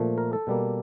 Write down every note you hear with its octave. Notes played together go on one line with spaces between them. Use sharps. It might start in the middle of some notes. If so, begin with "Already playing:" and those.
Already playing: A#2 F3 A3
A#4
A4
B2 G3 A#3